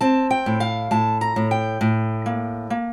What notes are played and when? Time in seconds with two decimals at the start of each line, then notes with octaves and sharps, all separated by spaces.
0.01 C4 A5
0.31 G5
0.46 A2
0.60 F5
0.91 A2 A5
1.21 A#5
1.36 A2
1.51 G5
1.81 A2
2.26 A#3
2.70 A#3